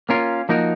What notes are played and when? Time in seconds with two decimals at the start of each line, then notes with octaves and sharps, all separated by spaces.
0.09 A#3 C#4 F4 A#4
0.49 F3 A#3 D#4 F#4 A#4